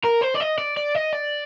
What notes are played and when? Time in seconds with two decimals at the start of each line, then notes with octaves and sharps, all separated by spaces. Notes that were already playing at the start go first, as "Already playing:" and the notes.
0.05 A#4
0.22 C5
0.35 D5
0.41 D#5
0.58 D5
0.77 D5
0.95 D#5
1.13 D5